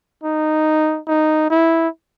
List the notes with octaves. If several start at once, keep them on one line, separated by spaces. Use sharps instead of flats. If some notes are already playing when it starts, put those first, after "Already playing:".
D#4
D#4
E4